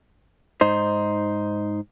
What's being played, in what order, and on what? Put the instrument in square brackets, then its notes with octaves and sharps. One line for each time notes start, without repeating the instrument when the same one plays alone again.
[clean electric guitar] G#2 D#4 C5